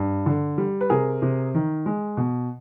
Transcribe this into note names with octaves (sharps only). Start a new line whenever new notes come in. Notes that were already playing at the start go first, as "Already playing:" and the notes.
Already playing: G2
D3
G3
B4
C3 G#4 A#4
C3
D#3
G#3
B2